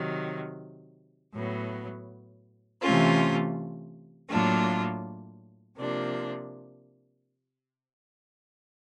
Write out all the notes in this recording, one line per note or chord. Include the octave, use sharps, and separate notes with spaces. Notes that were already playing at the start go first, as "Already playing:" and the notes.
Already playing: C3 D#3 F#3
A2 F#3 B3
C3 E3 A3 C#4 F4
A2 F#3 A#3 D4 F4
C3 F3 A#3 D4